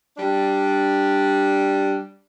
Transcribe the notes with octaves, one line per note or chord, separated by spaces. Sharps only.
G3 D4